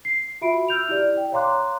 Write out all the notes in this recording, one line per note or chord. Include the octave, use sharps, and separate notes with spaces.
C7
F4 F#4 E5 B5 D7
E6 F6 G6 F7
E4 G4 D5
G5
C#5 F5 A#5 C6 D6 F#6